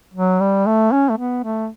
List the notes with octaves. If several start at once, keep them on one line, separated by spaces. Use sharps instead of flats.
F#3
G3
A3
C#4
A3
B3
A3